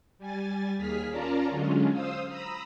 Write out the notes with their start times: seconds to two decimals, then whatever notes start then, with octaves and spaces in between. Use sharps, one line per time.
0.18 G3 G#5 A6
0.77 D#2 G#4 F6 B6
1.10 C#4 F4 A#4 D5 A5 A#5
1.49 D3 F#3 G#3 C#4 F4
1.93 C5 F5 D#6 E6
2.28 A#5 B5 D#6 E6